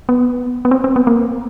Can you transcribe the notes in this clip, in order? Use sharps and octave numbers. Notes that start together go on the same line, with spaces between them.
B3
B3
C4
C4
B3
A#3